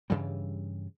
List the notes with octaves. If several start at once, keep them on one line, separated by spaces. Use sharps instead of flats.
G2 C#3 E3 G3